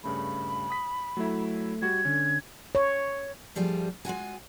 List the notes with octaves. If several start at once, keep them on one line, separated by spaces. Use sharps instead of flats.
G2 C#3 A3 B5
D#6 B6
F#3 A3 E4
G3 F#4 G#6
D3 C#4
C#5
G2 F3 G3 A3 F4 G#4
G#3 F4 F#4 G#5